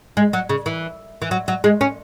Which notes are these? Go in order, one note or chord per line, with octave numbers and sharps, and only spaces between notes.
G#3
F#3
C#3
E3
E3
F#3
F#3
G#3
C#4